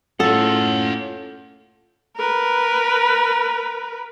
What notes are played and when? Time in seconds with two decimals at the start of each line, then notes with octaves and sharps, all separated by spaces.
0.20 A2 C#4 F4 G#4 A4 F#5
2.17 A#4 B4